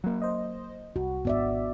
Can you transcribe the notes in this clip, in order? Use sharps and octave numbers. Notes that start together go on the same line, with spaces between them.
F#3 A#3
C5 D#5
C2 F#4
G#1 B3 D5 E5